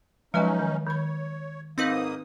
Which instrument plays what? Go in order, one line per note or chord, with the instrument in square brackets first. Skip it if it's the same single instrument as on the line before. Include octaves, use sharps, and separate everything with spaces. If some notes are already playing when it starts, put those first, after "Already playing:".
[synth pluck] F3 F#3 [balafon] G#3 B4 D#5 [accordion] C#4 D#4
[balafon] D#3
[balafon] D#3 B5 [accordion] C#5
[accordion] G#2 A#3 D#6 [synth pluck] C4 D#4 B4